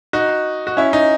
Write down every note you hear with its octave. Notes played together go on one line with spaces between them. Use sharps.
D#4 F#4
F#4
C#4 E4
D#4